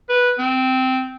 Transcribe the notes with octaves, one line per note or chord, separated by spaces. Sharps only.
B4
C4